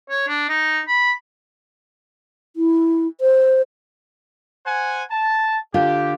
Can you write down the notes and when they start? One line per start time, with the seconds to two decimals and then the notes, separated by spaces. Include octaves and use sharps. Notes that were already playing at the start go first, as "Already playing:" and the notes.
0.10 C#5
0.28 D4
0.49 D#4
0.87 B5
2.56 E4
3.21 C5
4.67 C5 F#5 G#5
5.11 A5
5.74 D3 F4 G4